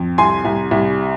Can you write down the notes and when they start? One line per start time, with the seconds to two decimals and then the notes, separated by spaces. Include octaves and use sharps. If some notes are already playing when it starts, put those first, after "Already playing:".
Already playing: F2
0.18 C2 G#5 C6
0.45 C2
0.71 C2